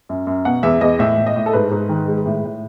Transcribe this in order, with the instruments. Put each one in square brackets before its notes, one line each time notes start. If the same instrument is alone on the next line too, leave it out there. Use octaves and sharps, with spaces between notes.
[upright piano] F#2
F#2
B2 F#5
E2 E5
E2 D#5
A2 E5
A2
D#5
A2
A4
G#2 B4
G#2
D#3
G#3
A2
A2